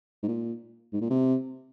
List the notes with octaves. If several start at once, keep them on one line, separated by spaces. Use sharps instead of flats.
G#2
A#2
G#2
A#2
C3